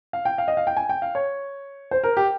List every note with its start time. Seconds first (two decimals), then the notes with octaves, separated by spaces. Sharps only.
0.13 F5
0.25 G5
0.38 F5
0.48 D#5
0.57 F5
0.67 G5
0.77 G#5
0.89 G5
1.02 F5
1.15 C#5
1.91 C5
2.03 A#4
2.17 G4